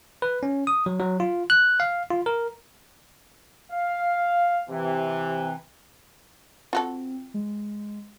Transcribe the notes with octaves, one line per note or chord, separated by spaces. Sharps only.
B4
C#4
D#6
F#3
F#3
F4
F#6
F5
F4
A#4
F5
C3 E3
C4 F4 F#4 A4
G#3